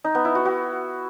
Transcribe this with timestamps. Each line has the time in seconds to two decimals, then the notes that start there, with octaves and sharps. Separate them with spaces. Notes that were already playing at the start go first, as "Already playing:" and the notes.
0.04 D#4
0.15 B3
0.25 E4
0.35 F#4
0.45 F#4